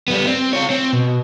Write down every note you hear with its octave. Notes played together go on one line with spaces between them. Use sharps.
G3 B3
C4
F4 C#5
C4
B2